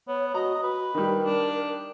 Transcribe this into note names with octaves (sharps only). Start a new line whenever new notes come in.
B3 C#5
F#4 D#5 A#5
F#4 B4
D#3 G3 A#4
D4